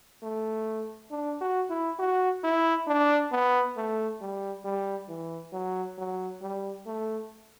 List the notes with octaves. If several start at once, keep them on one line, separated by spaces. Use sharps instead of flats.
A3
D4
F#4
E4
F#4
E4
D4
B3
A3
G3
G3
E3
F#3
F#3
G3
A3